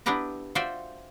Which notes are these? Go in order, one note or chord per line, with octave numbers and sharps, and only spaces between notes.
B3 D4 E4 G4 B4 A#5
F4 F#4 C5 D5 E5 G5